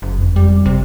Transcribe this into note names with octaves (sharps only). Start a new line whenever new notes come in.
F#1
F2
G3
G#1 C3